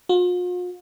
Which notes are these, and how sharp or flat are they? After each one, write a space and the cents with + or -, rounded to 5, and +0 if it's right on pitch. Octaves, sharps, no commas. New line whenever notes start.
F4 +45